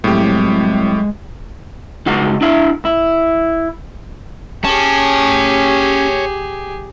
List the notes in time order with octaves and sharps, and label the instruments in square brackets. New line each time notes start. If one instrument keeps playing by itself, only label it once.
[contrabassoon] C2 [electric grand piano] A2 G4 [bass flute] F#3 [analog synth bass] G#3
[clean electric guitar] C#2 D#4 F#4 F#5
D4 E4 E5 F5
E4
[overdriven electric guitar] C#4 [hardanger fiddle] G4 G#4 [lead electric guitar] C#5 A5